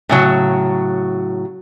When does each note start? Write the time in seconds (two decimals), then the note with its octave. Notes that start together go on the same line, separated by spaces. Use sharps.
0.09 A2 C#3 F#3